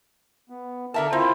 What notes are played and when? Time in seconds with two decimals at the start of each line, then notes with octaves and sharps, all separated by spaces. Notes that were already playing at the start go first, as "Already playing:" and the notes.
0.50 B3
0.94 D3 A#4 E5 A5
1.13 C4 E4 F4 C5